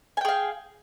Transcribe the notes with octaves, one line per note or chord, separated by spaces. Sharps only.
G#4 F5 G5 G#5